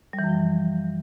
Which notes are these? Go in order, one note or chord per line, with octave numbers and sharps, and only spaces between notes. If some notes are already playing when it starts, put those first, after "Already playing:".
G3
E3
F#2
F3